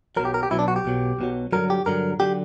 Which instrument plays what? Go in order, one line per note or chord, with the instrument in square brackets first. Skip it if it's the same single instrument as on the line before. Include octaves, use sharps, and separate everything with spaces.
[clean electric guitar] B1 B2 F#3 A#4
G4
A#4
G4
B1 B2 F#3 E4
D4
F#4
G4
B1 B2 F#3
B1 B2 F#3
G2 D3 F#3 A#4
G4
G2 D3 F#3 A#4
D3 F#3 G4